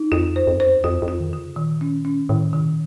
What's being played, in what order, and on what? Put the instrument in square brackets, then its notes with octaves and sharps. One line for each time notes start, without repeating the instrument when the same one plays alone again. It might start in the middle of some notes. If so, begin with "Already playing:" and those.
Already playing: [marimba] D#4
[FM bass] F2 [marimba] F4
[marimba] C5
[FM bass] F2
F#2
[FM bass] F2 [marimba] C5
[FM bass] F2 [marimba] F4
[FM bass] F2
[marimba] F4
[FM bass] D#3
[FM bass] C#3 [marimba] F4
[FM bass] A#2 [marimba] D#3
[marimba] C#4
C#4
[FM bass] A2 [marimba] D#3
[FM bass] C3 [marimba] D#3
[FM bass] A#2